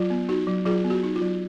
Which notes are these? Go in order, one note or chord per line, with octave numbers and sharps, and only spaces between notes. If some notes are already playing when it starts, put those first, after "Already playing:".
Already playing: F#3 F4
B3
D#4 F#4
F#3
F#3 F4 G#4
B3
F#4
D#4
F4
F#3